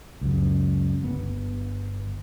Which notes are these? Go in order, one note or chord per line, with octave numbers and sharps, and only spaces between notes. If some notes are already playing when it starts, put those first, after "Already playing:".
C#2 F#2
G1 B3